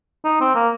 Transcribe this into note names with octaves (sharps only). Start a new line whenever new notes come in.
D#4
C4
A#3